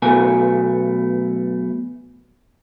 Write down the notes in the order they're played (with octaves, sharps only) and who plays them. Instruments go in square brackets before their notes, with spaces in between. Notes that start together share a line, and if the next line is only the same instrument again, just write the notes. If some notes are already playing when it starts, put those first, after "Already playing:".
[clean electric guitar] B1 B2 A3 G#5